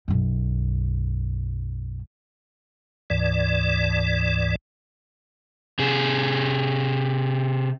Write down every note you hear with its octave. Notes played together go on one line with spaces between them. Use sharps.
B1 F#2
D2 G#2 E3 D5
C3 G#4